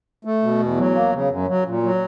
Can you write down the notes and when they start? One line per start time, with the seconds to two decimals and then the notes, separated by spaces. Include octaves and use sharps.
0.25 A3
0.42 B2
0.59 E2
0.77 F#3
0.95 A#3
1.13 C#3
1.30 F#2
1.47 F#3
1.65 A#2
1.83 F#3